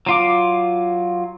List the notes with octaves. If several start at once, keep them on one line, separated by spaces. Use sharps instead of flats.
F#3 F4 D6